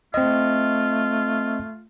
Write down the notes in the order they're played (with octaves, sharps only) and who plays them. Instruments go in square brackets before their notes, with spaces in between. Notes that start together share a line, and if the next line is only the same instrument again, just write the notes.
[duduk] A3 [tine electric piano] C4 D#5 [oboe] F4